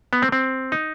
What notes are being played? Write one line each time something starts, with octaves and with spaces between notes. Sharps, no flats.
B3
C4
C4
D#4